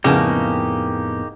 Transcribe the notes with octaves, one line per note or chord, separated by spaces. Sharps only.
F2 A2 C#3 A#3 B3 D#4 G4 A5